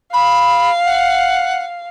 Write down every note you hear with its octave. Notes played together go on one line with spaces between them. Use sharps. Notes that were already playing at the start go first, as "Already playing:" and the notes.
F5 B5
F#5